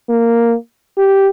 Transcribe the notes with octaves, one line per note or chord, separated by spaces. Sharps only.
A#3
G4